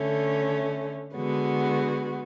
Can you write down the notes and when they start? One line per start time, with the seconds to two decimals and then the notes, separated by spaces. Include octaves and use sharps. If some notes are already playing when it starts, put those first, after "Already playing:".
Already playing: D3 A3 C#4
1.14 D3 G#3 B3 F#4